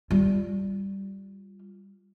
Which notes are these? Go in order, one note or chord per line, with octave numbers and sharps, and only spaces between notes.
G3 F4